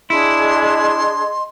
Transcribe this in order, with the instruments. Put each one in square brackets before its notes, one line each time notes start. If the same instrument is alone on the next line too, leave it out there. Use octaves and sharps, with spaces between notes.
[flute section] D4 G#4 [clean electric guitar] E4 [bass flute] D#5 [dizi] C6